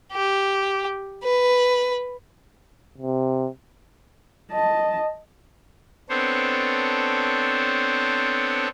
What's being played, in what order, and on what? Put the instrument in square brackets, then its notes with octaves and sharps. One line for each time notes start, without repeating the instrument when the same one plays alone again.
[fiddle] G4
B4
[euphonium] C3
[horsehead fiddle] D#5 A5
[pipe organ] B3 C4 D4 A4 C5 C#5